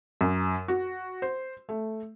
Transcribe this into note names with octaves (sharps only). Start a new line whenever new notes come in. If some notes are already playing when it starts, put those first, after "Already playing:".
F#2
F#4
C5
A3